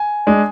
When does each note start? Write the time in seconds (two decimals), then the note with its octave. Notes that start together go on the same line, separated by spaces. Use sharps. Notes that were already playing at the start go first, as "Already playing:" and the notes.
Already playing: G#5
0.27 G#3 D4